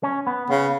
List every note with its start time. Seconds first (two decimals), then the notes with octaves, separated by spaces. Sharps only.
0.03 C#4
0.27 B3
0.50 C#3 B3